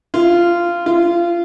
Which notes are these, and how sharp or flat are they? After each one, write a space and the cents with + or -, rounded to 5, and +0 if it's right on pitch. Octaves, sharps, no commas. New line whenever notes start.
F4 -15
F4 -25